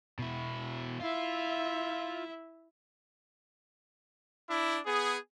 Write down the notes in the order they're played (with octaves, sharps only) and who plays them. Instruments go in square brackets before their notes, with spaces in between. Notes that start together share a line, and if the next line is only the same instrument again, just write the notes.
[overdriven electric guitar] B2 E4
[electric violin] E4 E5 [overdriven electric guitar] F4
[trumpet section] D4 E4
B3 G#4